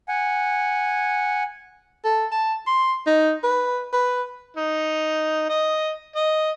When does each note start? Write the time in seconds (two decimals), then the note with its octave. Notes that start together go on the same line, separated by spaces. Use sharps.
0.08 F#5 G#5
2.05 A4
2.32 A5
2.67 C6
3.07 D#4
3.44 B4
3.93 B4
4.56 D#4
5.49 D#5
6.16 D#5